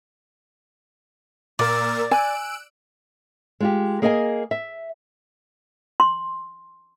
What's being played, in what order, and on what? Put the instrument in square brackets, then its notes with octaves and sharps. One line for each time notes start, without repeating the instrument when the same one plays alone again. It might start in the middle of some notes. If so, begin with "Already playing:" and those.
[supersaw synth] A#2 A#4 E6 [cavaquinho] D5
[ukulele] G#5 [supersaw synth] E6 F#6 D7
[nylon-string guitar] G#3 F4 G4
A#3 G#4 A#4 D#5 F5 G#5
E5
[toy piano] C6